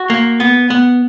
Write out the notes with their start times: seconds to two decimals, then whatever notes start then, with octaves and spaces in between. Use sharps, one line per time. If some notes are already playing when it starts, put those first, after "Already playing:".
Already playing: F#4
0.10 A#3
0.40 B3
0.70 B3